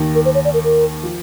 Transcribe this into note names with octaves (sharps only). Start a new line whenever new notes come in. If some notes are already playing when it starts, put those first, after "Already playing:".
Already playing: D#2 D#3
A#4
C5
C#5
D5
A#4
A#4
F3